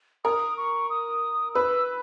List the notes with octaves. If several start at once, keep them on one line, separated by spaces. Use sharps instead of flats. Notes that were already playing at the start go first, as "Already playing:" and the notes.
A#4 D#6
C#6
D#6
B4 E6